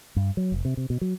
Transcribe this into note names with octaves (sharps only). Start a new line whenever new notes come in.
G2
F#3
F1
C3
C3
B2
F#3